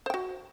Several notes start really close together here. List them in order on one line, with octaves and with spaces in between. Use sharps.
C5 G5 F#4